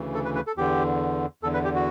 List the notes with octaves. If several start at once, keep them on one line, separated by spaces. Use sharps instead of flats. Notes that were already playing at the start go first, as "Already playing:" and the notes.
Already playing: D2 C#3 E3
A4
B4
B4
A4
E2 D3 G4
E2 D3 A4
B4
G4
F#4